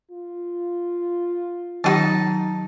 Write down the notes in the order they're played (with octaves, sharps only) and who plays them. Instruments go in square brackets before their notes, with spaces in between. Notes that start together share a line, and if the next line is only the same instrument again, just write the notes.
[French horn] F4
[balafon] D#3 F#3 G4 [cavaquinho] D#4 F#4 A5